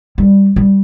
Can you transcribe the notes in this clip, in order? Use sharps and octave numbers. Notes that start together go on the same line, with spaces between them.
G3
G3